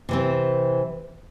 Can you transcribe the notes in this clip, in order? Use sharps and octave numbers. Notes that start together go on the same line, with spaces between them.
C3 E3 C4